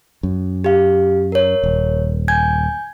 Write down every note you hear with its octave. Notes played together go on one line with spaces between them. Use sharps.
F#2
G4 F5
A#4 C#5
D#1
G#5 G6 G#6